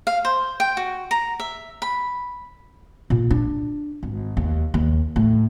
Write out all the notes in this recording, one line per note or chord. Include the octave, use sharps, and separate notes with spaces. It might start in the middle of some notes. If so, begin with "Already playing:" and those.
F5
C5
G5
F#4
A#5
E5
B5
A#2
D4
G#1
D#2
D#2
A2